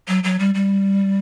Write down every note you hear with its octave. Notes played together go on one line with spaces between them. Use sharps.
F#3
F#3
G3
G3